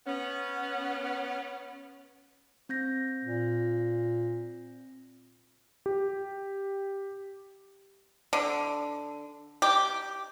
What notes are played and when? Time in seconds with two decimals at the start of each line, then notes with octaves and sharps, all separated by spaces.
0.07 B3 C#4
2.69 C4 G6 A#6
3.24 A#2
5.86 G4
8.33 D3
9.62 G4